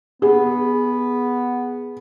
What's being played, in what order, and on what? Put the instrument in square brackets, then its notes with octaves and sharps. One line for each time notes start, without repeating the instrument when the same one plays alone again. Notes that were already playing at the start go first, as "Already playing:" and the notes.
[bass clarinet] B3 [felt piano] G#4